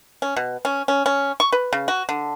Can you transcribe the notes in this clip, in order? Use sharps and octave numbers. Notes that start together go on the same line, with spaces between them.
C#4
B2
C#4
C#4
C#4
C#6
B4
C#3
F#4
D3